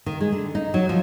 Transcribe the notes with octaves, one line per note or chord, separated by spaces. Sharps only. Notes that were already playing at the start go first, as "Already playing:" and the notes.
D#3
G#3
D3
D#4
F#3
F3